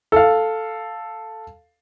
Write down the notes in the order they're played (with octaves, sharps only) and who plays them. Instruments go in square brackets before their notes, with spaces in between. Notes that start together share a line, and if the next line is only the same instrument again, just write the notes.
[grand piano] A4 F5